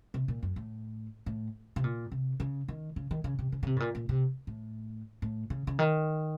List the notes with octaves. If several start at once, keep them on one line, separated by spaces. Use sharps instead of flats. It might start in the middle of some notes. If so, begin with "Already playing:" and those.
C3
A#2
F#2
A2
A2
C3
A#2
C3
C#3
D#3
C#3
D#3
C#3
C3
C#3
C#3
C3
A2
A#2
A#2
C3
A2
A2
C#3
C#3
D#3